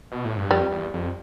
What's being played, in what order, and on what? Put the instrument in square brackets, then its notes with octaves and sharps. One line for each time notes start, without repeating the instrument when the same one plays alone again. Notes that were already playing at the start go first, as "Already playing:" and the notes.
[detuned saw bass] B2
A2
G2
[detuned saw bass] F2 [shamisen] G3
[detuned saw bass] E2
F2